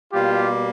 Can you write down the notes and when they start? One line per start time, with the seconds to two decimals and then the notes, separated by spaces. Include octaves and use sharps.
0.13 B2 G3 A#3 F4 G4